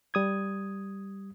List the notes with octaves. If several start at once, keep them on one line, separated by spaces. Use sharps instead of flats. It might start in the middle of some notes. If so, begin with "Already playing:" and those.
G3 D#6 G#6